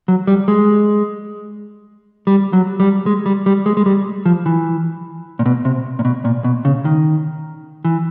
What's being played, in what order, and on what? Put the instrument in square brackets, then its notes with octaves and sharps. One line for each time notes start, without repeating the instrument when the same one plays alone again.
[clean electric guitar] F#3
G3
G#3
G3
F#3
G3
G#3
G3
G3
G#3
G#3
G3
F3
E3
A#2
B2
C3
A#2
B2
A#2
B2
C#3
D#3
E3